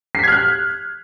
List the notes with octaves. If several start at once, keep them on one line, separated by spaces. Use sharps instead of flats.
F6 F#6 G#6 B6 C7